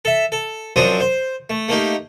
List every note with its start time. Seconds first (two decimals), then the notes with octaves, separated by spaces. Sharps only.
0.05 A4 E5
0.32 A4
0.76 F#2 F3 C4 D4 F#4 D#6
1.00 C5
1.50 A3
1.68 A3 A#3 D#4 G4